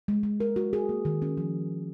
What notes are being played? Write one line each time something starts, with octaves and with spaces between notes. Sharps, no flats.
G#3
G#3
A#4
F#4
G#4
A#3
D#3
C#4
F3